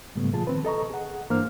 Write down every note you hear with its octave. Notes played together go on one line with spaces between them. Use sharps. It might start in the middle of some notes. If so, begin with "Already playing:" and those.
G#2 C#3 G3 A3 B3
A#2 F3 F4 G#4 A5
D#3 C4 B4
A4 D#5 A#5 C#6
G#4 F#5
G2 E3 A#3 D4 C5 F6